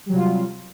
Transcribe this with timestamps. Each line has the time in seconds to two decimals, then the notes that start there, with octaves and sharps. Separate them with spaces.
0.06 G3
0.09 F#3
0.13 C3
0.16 F4